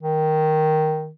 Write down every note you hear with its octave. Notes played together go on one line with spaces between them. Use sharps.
D#3